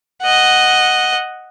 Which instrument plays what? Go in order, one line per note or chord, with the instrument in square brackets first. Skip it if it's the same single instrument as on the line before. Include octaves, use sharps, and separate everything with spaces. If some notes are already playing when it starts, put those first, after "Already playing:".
[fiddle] D#5 F#5